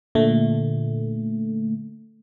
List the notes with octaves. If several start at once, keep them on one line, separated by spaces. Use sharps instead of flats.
A#2 D3 A3